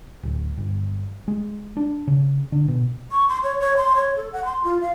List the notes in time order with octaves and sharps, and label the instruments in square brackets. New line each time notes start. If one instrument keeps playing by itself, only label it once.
[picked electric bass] D1
G1
G#3
D4
C#3
D3
B2
[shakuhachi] C#6
C6
C#5
C#5
C6
C#5
A4
F#5
C6
F4
F5